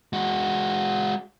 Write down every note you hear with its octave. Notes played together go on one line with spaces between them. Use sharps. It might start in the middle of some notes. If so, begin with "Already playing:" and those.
G#3 F#4